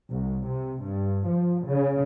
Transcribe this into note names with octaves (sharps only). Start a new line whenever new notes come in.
C2
C3
G2
F3
C#3